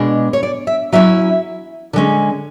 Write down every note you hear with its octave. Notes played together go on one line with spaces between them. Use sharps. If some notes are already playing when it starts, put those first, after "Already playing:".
Already playing: B2 G#3 D4
C#5
D5
E5
F#3 C#4 E4 E5
D3 G#3 C#4